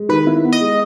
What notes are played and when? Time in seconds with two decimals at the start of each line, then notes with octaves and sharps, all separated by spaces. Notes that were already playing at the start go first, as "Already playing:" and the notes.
Already playing: G#3
0.09 D#3 B4
0.27 E4
0.44 B3
0.53 D#5
0.61 G#3